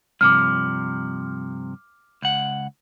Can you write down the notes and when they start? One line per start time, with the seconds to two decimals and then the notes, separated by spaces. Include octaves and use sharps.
0.21 G2 C3 F3 D6 F6
2.22 C#2 F#5